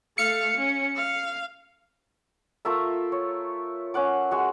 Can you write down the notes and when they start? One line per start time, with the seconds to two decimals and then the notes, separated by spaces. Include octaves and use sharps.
0.18 A3 F5 C#7
0.57 C#4
0.96 F5
2.65 A3 F4 A#4 E5
3.12 C#5
3.94 C#4 C#5 F#5 D6
4.31 G#3 F#4